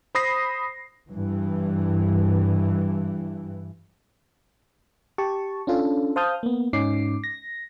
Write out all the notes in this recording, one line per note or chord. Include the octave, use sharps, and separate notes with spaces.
C5 B5 D#6 A#6 C7
G2 E3
G4 A5 C#6
C#4 D4 F4 A4
C5 F5 A5 D#6 F6 G6
A#3 B3
G#2 C#4 D#4 D6 C7
A#6